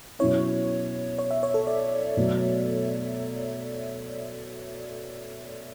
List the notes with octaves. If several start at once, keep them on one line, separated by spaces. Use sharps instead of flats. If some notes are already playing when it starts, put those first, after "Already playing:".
B2 F#3 C#4 E4 C#5
C#5
E5
C#5
A4
D5
B2 F#3 A3